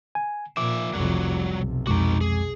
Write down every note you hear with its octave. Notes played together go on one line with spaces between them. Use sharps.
G#5
A#2 F3 E5 D6
F1 C2 F#3 G3 F#4
B1 C3
F2 G#3 D#4 F#4 D6
G#4